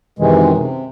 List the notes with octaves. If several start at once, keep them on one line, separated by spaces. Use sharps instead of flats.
F#2 C3 D#3 E3 G#3
C3